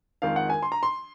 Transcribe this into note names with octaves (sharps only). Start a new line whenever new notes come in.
F2 D#3 G#3 F5
F#5
G#5
C6
A#5
C6